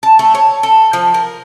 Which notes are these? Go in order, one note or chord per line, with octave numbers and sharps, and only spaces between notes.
A5
A3
C#5
A4
F3
A#4